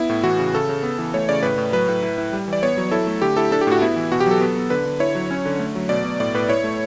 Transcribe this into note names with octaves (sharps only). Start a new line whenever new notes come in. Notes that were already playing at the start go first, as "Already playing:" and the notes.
Already playing: B3 E4
A2
E3 F#4
C#3
C#3 A4
C#3
B3
E3
A3 C#5
C#3 D5
A2 B4
A2
F#3 B4
A2
E4
E4
G3
E3 D5
B3 C#5
F#3
E4 A4
A3
D3 G4
E4 A4
D4 A4
G4
A2 F#4
B3 E4
E3
B2 F#4
G4
F#3 A4
B3
B3
D3 B4
D3
E4 C#5
F#3
C#4
D3
A3
F#3
B2 D5
B2
A2 D5
A2 B4
E4 C#5
A3